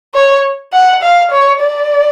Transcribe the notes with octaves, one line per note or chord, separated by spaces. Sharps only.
C#5
F#5
F5
C#5
D5